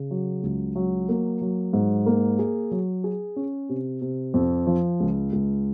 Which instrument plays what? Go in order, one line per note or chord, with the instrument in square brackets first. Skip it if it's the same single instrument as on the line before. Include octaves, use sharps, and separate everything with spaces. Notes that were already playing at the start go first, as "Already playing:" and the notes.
Already playing: [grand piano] C#3
F#3
C#2
F#3
A#3
F#3
G#2
A#3
G#4
F#3
G#4
C#4
C3
C3
F2
F3
C#2
C#2